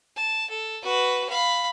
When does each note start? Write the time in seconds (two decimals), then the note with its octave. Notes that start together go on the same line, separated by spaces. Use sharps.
0.16 A5
0.50 A4
0.82 F#4 B4
1.29 F5 B5